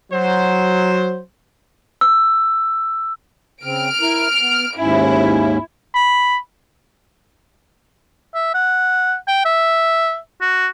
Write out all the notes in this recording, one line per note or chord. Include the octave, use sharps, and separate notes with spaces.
F#3 C5
E6
C#3 C4 F6 D7
E4 A#4
B3
D#2 G#2 C#4 E4
B5
E5
F#5
G5
E5
F#4